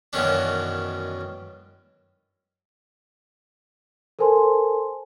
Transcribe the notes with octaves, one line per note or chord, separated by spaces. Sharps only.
F#2 B2 D#3 E3 C#4 D4
A4 A#4 C5 G#5 A5 C6